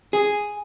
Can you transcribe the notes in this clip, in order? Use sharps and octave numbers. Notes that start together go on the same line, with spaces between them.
G#4